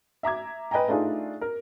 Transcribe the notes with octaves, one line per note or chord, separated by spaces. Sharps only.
E5 A#5 D6 G#6
B4 D#5 G5 G#5 A#5
A3 D4 D#4 F4 G#4
A#4